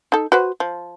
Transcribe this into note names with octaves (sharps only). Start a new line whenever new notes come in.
D#4 A4
F#4 B4 C5
F3